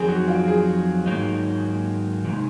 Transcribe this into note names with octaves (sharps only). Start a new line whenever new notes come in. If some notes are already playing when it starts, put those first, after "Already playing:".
Already playing: F2 D#3 F#3 C4 G#4
F#4
F4
G#4
G#2 D#3 F#3 A#3 D#4
C3 D#3 G#3 D#4